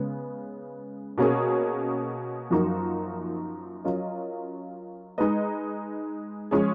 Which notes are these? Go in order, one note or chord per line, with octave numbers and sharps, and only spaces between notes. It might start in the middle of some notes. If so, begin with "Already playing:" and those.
Already playing: C#3 G#3 B3
B2 A#3 C#4 G#4
F#2 F3 A#3 D#4 F#4
F#3 C#4 F4 A#4 D#5
G#3 D#4 G#4 B4 D#5
F3 G#3 C#4 G#4